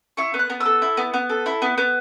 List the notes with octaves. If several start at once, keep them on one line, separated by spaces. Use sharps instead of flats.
E4 C#6
B3
F#6
B3
E6
A4
E4
B3
B3
A4
E4
B3
B3